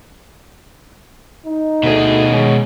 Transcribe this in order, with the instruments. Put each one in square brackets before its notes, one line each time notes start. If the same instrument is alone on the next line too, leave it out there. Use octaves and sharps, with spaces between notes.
[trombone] D#4
[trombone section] D2 [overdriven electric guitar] B2 G#4
[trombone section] D#3 G#3 C#4